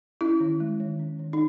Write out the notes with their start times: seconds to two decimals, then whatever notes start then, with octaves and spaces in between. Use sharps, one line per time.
0.21 C#4 E4
0.40 D#3
0.60 G#3
0.80 D#3
0.99 C#4
1.19 D#3
1.33 D#4